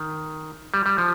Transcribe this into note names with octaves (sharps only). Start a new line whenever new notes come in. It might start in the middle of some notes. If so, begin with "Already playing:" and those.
Already playing: D#3
G3
G3
F3